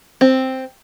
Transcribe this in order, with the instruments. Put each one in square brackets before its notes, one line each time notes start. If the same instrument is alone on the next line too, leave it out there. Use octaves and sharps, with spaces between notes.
[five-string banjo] C4